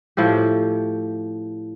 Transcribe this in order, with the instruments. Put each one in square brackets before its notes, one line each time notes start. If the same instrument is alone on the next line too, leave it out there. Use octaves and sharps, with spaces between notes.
[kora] A2 F3 E4 G4